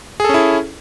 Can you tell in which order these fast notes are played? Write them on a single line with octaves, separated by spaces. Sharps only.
G#4 A4 C#4 E4